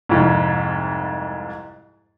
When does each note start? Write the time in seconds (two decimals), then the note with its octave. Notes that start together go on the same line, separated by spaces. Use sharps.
0.09 C2 F2 G#2